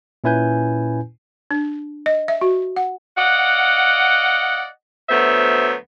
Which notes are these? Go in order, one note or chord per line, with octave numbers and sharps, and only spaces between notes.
A#2 C#4 E4 B4 G#5 G6
D4
D#5
E5
F#4
F#5
D5 D#5 F5 F#5
D2 F#3 B3 C5 E5